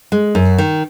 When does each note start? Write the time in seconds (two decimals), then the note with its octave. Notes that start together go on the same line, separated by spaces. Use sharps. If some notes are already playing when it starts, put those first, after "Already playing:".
0.12 G#3
0.35 F#2
0.58 D#3